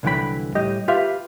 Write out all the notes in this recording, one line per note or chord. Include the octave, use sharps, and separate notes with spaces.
C2 D3 E3 F#3 G5 B5
A2 G3 G4 D#5
F4 G4 B4 E5 F5